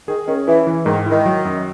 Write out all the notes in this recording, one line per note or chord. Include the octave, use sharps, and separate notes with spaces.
D#3 G#4
D#3 C#4
E3 E4
E3
G#2 D#3
D#3 E4
F#3
F#2